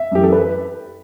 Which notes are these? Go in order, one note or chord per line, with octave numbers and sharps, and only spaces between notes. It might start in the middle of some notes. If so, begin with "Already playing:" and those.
Already playing: E5
F#2 E3 G4
A4
B4